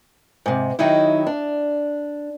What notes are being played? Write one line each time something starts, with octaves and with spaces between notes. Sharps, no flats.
G#2 C3
D#3 F#3 D#4 E4
D4